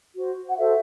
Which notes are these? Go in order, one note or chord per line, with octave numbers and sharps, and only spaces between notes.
F#4 C5
F#5
F#4 A4 C5 E5